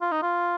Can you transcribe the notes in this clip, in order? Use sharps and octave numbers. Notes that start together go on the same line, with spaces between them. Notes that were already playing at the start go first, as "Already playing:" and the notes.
F4
D#4
F4